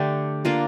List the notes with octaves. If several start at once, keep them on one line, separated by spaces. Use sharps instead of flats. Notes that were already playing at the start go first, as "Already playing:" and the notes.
Already playing: D3 A3 D4 G4
A#3 D4 F4 A#4